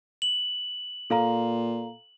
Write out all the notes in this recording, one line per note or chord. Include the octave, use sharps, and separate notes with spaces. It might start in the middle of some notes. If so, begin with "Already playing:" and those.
F#7
A#2 A4 F5 A#5